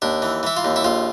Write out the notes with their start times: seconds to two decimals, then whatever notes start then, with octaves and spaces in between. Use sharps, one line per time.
0.02 D#2 D4
0.22 E3
0.43 E3 E4
0.57 F4
0.64 D#2
0.76 E4
0.84 A#1 F4